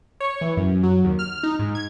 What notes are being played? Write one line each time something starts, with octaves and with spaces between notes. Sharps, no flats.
C#5
E3
F#2
F#3
D#2
F6
D#4
G#2
G#6